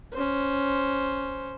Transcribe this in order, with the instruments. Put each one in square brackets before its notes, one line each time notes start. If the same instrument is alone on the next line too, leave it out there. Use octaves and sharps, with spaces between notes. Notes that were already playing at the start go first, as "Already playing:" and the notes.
[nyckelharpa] C#4 C5